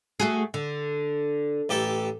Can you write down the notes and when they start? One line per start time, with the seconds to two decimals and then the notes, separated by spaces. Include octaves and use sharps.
0.20 A3 F#4 G#4
0.54 D3
1.69 A1 G4 A4